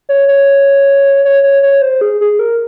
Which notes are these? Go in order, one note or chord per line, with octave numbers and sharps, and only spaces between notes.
C#5
C#5
C#5
C#5
C#5
C5
G#4
G#4
A#4